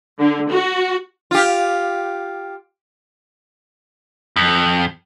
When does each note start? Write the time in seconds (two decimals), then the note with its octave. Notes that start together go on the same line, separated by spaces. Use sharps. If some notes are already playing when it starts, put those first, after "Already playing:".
0.20 D3
0.51 F#4
1.31 F4 G4
4.36 F2